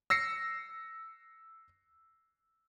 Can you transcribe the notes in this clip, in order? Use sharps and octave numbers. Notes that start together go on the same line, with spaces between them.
E6 A#6 C7 C#7